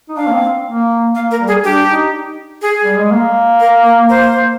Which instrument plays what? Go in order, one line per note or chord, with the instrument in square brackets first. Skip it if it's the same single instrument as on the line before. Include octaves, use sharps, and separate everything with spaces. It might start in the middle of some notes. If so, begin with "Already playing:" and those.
[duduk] D#4
[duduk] D4 [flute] F5
[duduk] A#3
C4
A#3
[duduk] A#3 [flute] F5
[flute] A#4
[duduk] G3
[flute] G#4
[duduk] D4 [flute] G4
[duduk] D#4
[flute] G#4
[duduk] G3
G#3
A#3
[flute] A#4
A#4
C5